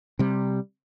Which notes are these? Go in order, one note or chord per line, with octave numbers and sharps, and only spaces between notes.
C3 G3